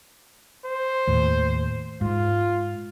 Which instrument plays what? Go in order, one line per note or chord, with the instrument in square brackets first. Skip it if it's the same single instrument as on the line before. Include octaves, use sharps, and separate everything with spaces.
[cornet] C5
[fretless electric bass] D#2 A2
[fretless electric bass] G#2 [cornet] F4